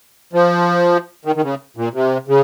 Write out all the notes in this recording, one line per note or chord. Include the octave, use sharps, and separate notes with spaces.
F3
D#3
D#3
C#3
A#2
C3
C#3